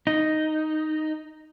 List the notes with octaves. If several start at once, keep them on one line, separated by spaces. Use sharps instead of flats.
D#4